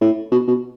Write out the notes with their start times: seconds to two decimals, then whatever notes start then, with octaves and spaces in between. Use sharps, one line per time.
0.01 A2
0.32 B2
0.48 B2